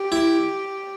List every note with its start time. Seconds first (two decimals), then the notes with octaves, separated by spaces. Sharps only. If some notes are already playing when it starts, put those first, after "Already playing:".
Already playing: G4
0.12 E4